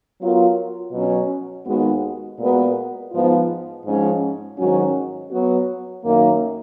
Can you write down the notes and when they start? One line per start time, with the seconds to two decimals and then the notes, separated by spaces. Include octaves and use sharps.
0.20 F#3 B3 F4 A#4
0.92 B2 F#3 C#4
1.66 D#2 D#3 G#3 B3 F#4
2.39 A#2 G#3 B3 F#4 A#4
3.12 G#2 F3 B3 F4
3.86 G#2 F3 G#3 C#4
4.58 G#2 D#3 F#3 C#4 F#4
5.31 F#3 B3 F#4
6.04 F#2 D#3 A#3